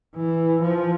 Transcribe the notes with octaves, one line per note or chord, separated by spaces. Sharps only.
E3
F3